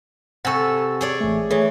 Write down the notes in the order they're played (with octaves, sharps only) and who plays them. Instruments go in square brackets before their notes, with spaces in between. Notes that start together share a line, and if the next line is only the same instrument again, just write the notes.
[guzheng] C3 A4 [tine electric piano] F#5 G#5 C#6
[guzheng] G#4 C#5 D5
[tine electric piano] A1 A3
[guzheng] E3 [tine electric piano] A3 G#4 C#5